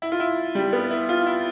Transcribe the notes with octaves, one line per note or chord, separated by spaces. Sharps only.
E4
F4
E4
G3
B3
E4
F4
E4